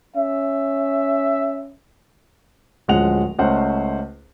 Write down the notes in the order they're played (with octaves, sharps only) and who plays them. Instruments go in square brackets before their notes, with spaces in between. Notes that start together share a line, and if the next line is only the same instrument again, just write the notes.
[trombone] C#4 [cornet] E5
[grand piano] D1 F3 G#3 C#4 F#5 F7
C#2 A3 C#4 C5 F#5